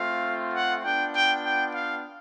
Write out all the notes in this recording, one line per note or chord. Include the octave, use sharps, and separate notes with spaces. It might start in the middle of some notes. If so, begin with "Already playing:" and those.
Already playing: A3 C4 F4 F5
F#5
B3 D4 F4 G5
G5
G5
F5